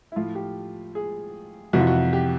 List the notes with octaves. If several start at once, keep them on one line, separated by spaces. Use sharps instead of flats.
E4
A2 F3 F4
G4
G#4
F2 C3 E3 F#4
F4
F#4
G4